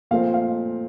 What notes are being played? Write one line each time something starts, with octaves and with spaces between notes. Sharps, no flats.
A#2 F3 A3 C4 F5
F5